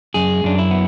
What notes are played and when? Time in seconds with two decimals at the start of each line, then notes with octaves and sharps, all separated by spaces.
0.14 F#2 G#4
0.44 F#2 D4
0.58 E4
0.71 B3